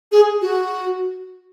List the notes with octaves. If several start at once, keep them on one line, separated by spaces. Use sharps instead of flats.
G#4
F#4